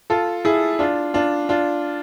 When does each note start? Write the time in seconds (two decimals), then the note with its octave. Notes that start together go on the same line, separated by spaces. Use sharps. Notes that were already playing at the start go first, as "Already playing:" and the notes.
0.10 F4 A4
0.45 E4 G#4
0.79 D4 F4
1.14 D4 F4
1.49 D4 F4